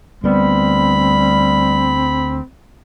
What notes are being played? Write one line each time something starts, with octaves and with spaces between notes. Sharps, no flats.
D2 G3 B3 C4 B5